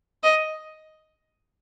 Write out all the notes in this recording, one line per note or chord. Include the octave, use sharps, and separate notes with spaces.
D#5